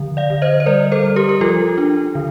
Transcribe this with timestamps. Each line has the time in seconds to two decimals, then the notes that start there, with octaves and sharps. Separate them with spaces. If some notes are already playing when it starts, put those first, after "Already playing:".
Already playing: D3 F3
0.17 D5 F5
0.30 D3
0.42 C5 D#5
0.60 C5
0.66 G3 A#4 D5
0.92 A4 C5
1.04 G3
1.16 G4 A#4
1.29 A#4
1.41 F3 F4 A4
1.78 D4
2.15 D3